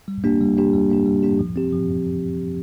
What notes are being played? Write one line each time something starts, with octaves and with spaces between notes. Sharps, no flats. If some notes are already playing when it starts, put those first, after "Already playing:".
G3
A#3 D4 G4
G3
A#3 D4 G4
G3
A#3 D4 G4
G3
A#3 D4 G4
F3
C4 G4
F3